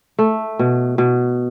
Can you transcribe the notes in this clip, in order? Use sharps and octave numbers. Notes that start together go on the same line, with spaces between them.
A3
B2
B2